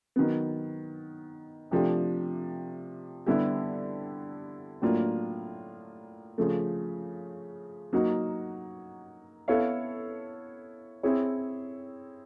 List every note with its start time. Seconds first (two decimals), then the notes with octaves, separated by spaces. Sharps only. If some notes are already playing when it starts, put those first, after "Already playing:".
0.16 D#3 F#3 B3
1.71 C3 F3 A3 D4 G4
3.26 D3 G3 B3 E4 G4
4.82 A2 F#3 A#3 D4 F4
6.38 C#3 F3 A3
7.93 F#3 A#3 D#4 F#4
9.48 B3 E4 A4 C#5 F5
11.03 C4 E4 G#4 C#5